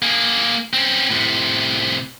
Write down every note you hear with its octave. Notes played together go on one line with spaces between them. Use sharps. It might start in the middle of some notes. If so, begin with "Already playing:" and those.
A#3 G#4
C4 C#4
A2 C3